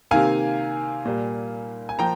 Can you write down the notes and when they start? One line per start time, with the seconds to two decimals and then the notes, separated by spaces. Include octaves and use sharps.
0.11 C3 D#3 A#3 F5 G#5
1.05 A#2 G3 A#3
1.89 G#5
1.99 F3 A#3 G5 A#5